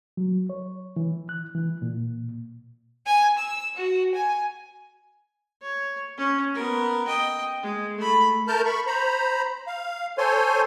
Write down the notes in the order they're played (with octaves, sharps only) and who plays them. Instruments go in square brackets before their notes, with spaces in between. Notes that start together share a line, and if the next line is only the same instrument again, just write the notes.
[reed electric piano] F#3
C#5
E3
F#6
E3
A#2
[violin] G#5
E6
F#4
G#5
[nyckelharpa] C#5
C#4
B3 A#4
D#5 G5
G#3
A3 B5
[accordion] A3 A#4 A5 F6 G6
B5 C#6
C5 A#5 B5
F5
A4 C5 C#5 G#5 C6